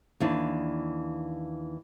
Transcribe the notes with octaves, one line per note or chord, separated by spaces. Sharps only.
D#2 E3 D4